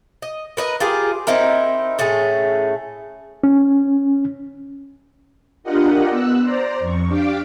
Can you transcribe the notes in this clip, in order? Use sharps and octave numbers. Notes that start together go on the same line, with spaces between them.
D#5
A#4 B4 D#5
F4 G4 G#4 A#4
C4 D#4 E4 A#4
A2 A3 C#4 G#4
C#4
D4 F4 G4 A#4 D#5 F#5
B3 E6 F#6
C5 D5 A#5
F2 C#6
D4 G4 F5 G5 D6